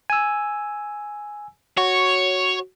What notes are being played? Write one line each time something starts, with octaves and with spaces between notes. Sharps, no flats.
G#5 E6
F#4 C#5